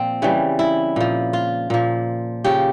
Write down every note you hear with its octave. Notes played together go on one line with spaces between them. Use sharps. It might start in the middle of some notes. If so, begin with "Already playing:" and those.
Already playing: A#2 F3 C4
C#3 E3 G3
E4
A#2 F3
F4
A#2 F3
C#3 F3 G4